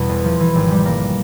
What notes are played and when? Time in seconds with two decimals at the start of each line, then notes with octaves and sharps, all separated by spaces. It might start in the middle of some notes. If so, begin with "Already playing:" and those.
Already playing: E2 B2 E3 G3
0.09 E1
0.25 F3
0.40 E3
0.55 G#1
0.71 G3
0.85 A#3